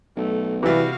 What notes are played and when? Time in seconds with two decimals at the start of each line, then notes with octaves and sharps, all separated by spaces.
0.17 B1 A3
0.63 C3 E3 G3 F#4 F5